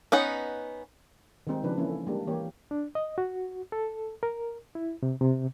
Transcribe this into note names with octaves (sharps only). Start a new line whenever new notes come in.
B3 C#4 D#4 F#5
D#3 G3 G#3 C4 D#4
C#3 F3 D4 G#4 B4
E3 A#3 C#4 D#4 E4
A4
G3 G#3 A#3 D4 G4
E3 A#3 G4 C#5
D4
D#5
F#4
A4
A#4
E4
C3
C3